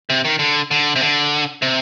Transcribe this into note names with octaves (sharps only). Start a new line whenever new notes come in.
C3
D#3
D3
D3
C3
D3
C3